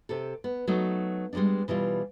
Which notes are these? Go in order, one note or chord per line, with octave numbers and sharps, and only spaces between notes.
C3 G4 A4
B3
F#3 A3 B3 D#4
G3 G#3 A#3 B3 D4
B2 E3 G3 F4